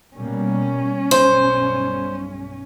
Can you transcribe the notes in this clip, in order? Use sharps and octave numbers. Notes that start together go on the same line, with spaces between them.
B2 G3 A#3 C#4
B1 G2 C5